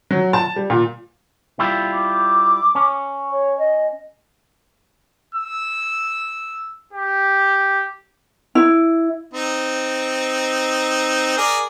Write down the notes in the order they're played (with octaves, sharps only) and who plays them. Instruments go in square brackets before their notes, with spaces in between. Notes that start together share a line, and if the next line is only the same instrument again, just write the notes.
[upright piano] F#3
A5
G3
A#2
[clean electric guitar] G3 E4 F4
[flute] D6
[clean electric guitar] C#4
[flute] C#5
D#5
[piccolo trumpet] E6
G4
[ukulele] E4
[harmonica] C4 D#4
G#4 A#4 D5